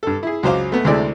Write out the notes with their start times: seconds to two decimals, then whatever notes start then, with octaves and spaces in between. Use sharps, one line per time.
0.03 G2 A4
0.23 E4 G#4
0.43 C#2 F#3 C5 F5 D6
0.72 A3 B3
0.85 D2 C3 G#3 E4 A4 D5